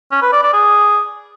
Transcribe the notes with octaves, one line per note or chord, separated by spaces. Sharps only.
C#4
B4
D5
D5
G#4